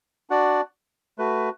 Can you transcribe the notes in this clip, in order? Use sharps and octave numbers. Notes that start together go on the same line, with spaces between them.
D4 F#4 D5 F#5
A3 F#4 B4